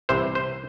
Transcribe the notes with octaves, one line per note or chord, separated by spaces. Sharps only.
C2 C3 E3 C5
C5